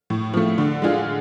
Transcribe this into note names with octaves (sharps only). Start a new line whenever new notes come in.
A2
F3 A3
D3
G#3 D4 F4 G#4